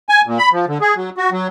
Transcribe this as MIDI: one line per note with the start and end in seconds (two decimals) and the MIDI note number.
0.09 0.21 80
0.27 0.38 46
0.38 0.49 83
0.52 0.65 53
0.68 0.78 50
0.81 0.94 68
0.96 1.10 54
1.17 1.30 66
1.32 1.47 54